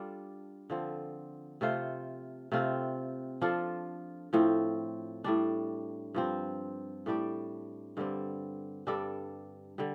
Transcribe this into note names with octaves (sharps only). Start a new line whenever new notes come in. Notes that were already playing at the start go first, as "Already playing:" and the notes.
Already playing: G3 D4 F4 A4
D3 F3 C4
C3 A3 F4 C5
C3 A3 C4 F4
F3 D4 F4 A4
A2 F3 C4
A2 G3 D4
G2 F3 C4
A2 G3 D4 G4
G2 D3 G3 C4
G2 G3 D4 A4
D3 G3